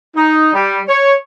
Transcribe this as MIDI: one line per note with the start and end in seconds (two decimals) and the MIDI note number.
0.16 0.51 63
0.54 0.80 55
0.88 1.13 73